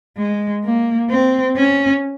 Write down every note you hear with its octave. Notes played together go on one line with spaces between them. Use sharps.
G#3
A#3
C4
C#4